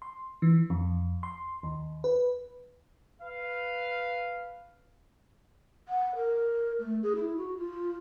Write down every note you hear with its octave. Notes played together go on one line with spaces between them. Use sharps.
C6
E3
F2
C6
D#2
B4
B4 F5
F#5
A#4
A3
G#4
E4
F#4
F4